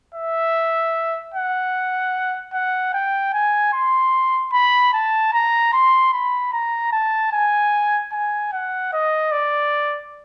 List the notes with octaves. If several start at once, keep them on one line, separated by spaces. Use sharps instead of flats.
E5
F#5
F#5
G5
G#5
C6
B5
A5
A#5
C6
B5
A#5
A5
G#5
G#5
F#5
D#5
D5